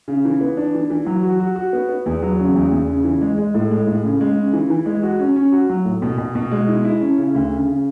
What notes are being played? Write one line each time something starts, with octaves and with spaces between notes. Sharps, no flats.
C#3
E3
B3
D4
E3
E3
F#3
F#4
F#4
F#4
B3
B3
E2
F#3
C#3
E2
E2
C#3
E3
G#3
G#3
A2
G#3
A2
C#3
G#3
C#3
E3
E3
G#3
F#4
C#4
C#4
F#4
F#3
A2
B2
B2
B2
G#3
E4
E4
C#4
C#3
D2
C#3
C#3